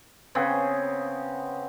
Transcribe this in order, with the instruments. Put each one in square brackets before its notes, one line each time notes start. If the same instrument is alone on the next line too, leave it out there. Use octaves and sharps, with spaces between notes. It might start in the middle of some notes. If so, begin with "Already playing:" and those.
[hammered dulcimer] C#3 B3 C4